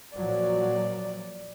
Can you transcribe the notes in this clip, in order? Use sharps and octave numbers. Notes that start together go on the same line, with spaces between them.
A#2 F3 F#3 D5